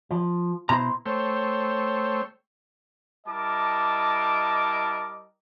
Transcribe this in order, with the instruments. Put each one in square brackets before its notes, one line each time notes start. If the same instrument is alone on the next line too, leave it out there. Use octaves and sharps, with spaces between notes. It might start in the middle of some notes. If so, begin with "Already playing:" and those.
[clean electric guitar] F3
[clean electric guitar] B2 E4 C5 [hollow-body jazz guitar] A#5
[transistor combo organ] A3 C5 C#5 G5 E6
[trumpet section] G3 E4 A#4 D#5 A5 D6